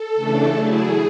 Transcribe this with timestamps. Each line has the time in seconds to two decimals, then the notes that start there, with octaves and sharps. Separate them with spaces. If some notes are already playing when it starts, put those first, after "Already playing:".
Already playing: A4
0.15 C#3 E3 A3 D4
0.53 F#3 A3 E4 G#4